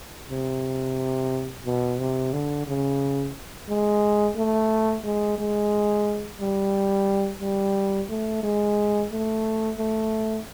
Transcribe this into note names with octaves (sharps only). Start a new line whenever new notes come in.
C3
B2
C3
D3
C#3
G#3
A3
G#3
G#3
G3
G3
A3
G#3
A3
A3